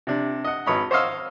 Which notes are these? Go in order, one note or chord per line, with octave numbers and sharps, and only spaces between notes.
C3 D4
D#5 F#5
G#1 B4 C#5 D#5 B5
C5 C#5 D#5 F5 E6